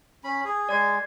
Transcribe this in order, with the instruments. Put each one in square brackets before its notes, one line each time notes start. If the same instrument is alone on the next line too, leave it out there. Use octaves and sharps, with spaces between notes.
[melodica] C#4 B5
G#4
[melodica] G#3 [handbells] D5 G#6 C7